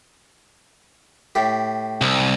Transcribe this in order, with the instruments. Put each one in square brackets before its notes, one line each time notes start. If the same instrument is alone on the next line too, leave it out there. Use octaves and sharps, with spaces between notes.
[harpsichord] A2 G4
[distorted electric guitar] C2